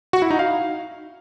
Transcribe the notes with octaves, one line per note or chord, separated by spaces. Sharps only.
F#4
E4
D#4
F5